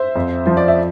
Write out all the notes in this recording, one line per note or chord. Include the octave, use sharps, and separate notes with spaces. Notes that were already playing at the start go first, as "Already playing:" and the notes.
Already playing: C5 E5
F2
F3 C5
D5
E5